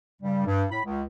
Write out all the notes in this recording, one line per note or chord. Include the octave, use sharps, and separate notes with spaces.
G2 C#3 G3
G2
A2 B5
C#2